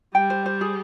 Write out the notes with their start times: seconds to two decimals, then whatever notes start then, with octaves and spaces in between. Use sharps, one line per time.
0.15 G3 G5
0.30 C5
0.46 C5
0.61 G#4